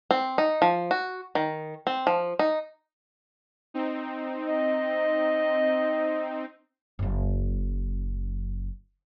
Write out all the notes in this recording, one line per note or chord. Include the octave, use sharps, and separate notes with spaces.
C4
D#4
F3
F#4
D#3
C4
F3
D#4
C4 D#4
D#5
F#1 F#2